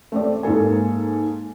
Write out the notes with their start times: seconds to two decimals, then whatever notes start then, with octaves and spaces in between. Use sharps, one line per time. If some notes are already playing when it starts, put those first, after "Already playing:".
0.12 A3 C4 D5
0.43 G#2 A#3 A4 G#5